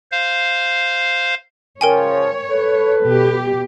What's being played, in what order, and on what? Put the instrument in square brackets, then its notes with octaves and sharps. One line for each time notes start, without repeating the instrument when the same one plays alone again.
[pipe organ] C5 F5
[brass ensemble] C#3 F3 [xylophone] A#4 G5 G#5 [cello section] C#5
[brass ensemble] A4 B4
[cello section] B2 G4